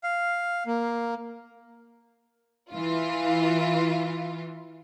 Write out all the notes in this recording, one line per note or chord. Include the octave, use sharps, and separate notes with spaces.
F5
A#3
E3 F4